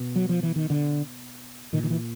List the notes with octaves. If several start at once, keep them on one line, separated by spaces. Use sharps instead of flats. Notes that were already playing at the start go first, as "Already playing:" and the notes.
Already playing: B2
F#3
F3
E3
D#3
D3
A#2 D#3
D#3
E3